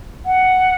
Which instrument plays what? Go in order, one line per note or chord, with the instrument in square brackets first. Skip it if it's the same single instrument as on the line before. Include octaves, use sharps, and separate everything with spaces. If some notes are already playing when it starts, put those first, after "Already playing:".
[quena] F#5